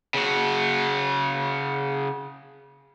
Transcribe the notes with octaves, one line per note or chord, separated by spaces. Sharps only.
C#3 F#4